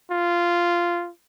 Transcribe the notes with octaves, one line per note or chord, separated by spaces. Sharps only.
F4